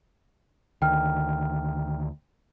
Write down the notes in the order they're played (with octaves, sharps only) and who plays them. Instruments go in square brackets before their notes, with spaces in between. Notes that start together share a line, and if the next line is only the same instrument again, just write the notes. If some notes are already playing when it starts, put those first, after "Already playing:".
[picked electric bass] D2 D#3 [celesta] G5 F6